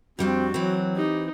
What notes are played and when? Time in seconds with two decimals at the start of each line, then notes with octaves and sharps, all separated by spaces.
0.19 F2 G3 C4 D4 F#4
0.54 E3 F#3 C4
0.96 D#4 G4